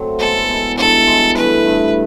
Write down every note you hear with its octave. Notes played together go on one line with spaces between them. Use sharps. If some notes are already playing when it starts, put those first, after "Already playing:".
Already playing: F#3 A3 C4
B2 G#3 B3 E4 A4
B2 G#3 B3 E4
G2 E3 G#3 A4
G2 E3 G#3
G2 E3 A3 B4
G2 E3 A3